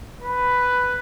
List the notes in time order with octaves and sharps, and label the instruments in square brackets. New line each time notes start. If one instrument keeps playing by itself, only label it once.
[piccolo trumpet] B4